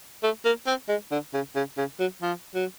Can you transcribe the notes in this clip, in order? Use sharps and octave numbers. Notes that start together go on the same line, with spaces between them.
A3
A#3
C4
G#3
D3
C#3
C#3
C#3
F#3
F3
F#3